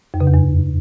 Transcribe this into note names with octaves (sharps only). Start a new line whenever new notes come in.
F2
C#3
E2
F#2